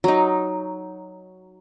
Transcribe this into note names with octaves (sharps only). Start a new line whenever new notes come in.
F#3 D#4